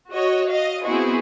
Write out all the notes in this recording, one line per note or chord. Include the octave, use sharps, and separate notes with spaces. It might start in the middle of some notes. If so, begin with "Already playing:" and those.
F#4 C#5 D#5
D#5 F5
B3 C4 E4 F#4 G#4